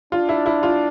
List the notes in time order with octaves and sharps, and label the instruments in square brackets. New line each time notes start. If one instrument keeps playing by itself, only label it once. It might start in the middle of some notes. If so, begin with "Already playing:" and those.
[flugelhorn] D4 [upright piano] F4
[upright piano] E4
E4
F4